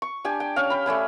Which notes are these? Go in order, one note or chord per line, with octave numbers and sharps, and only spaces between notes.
C#6
D4 G4 G#5
G5
C#4 F5
G5 B5
A3 D5 G#5 B5